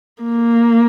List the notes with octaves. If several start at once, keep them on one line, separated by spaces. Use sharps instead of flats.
A#3